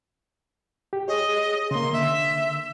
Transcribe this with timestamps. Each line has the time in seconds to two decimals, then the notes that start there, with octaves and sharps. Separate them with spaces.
0.93 G4
1.08 G#4 C#5 D#5
1.71 C#3 A#3 C6
1.93 D3 E5